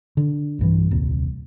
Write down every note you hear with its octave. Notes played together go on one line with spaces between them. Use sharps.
D3
B1 G2 E3
D#1 C2 A#2